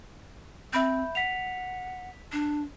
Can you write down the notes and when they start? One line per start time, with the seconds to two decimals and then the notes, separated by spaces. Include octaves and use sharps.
0.73 C4 E5 B5 G6
1.15 F#5 B6 F7
2.32 D4